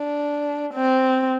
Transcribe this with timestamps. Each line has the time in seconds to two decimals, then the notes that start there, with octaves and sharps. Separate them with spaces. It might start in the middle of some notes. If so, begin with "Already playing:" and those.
Already playing: D4
0.74 C4